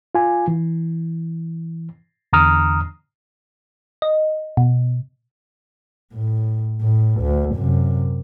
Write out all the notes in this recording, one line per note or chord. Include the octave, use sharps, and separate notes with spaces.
F4 G#5
E3
E2 D3 A#5 D#6 F6
D#5
B2
A2
A2
D2
F#2 C3